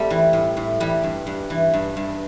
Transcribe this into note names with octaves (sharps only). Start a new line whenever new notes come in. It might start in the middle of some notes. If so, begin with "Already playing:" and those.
Already playing: G3 A3 C4
E3
A2
A2
E3 G3
G2
G2
E3
G2
G2